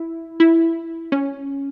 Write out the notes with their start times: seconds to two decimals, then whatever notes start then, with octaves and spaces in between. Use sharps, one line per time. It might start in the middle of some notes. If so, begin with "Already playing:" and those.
Already playing: E4
0.40 E4
1.12 C#4